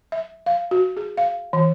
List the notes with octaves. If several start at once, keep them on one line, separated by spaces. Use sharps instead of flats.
E5
F5
F#4
G#4
F5
E3